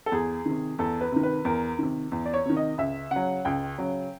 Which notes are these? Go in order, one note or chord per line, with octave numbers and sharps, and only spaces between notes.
A4
E2 G#4
C3 D#3
E2 A4
B4
C3 D#3
B4
E2 A#4
C3 D#3
E2
D5
C#5
C3 D#3
D#5
C#2 E5
C#3 F#3 F#5
C#2 G5
C#3 F#3